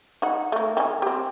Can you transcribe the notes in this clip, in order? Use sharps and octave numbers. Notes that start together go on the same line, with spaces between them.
D#4 F#5
A3 A#3
D#3 G#5
C4 G4